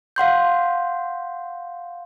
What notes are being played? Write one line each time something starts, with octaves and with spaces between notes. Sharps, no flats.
F5 F#5 C6 G6